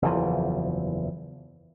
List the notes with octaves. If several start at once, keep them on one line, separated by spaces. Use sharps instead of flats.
F#1 E2 E3 F3